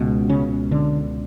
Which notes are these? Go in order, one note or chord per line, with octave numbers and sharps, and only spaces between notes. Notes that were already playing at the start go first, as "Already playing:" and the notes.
Already playing: C#2 B2
C#3 C#4
D3 D4